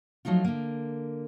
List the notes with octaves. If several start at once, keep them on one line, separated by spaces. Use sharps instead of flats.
F3 F#3 A3 D#4 F4
D3 A#3